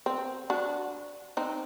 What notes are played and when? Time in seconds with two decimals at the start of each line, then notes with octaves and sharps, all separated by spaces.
0.06 C4
0.50 D4 F#4
1.37 C4 D#4